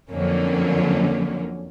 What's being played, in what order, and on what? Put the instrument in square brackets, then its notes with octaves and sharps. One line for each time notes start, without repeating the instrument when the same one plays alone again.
[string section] F2 D3 F#3 A#3 C#4